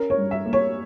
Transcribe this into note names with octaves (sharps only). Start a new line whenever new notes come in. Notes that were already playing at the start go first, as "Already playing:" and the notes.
Already playing: C#4 A#4
C#5
G2
E5
A#3
C#5